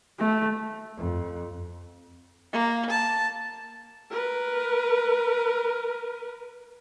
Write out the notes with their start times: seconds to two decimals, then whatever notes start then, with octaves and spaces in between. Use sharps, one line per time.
0.19 A3
0.97 F2
2.53 A#3
2.91 A5
4.10 A#4 B4